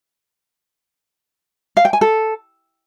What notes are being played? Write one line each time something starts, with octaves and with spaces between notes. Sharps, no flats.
F5
G5
G#5
A4